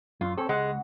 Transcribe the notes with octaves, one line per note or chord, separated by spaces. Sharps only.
F#2 F4
C4 C#4 A4
C#2 G#3 F#5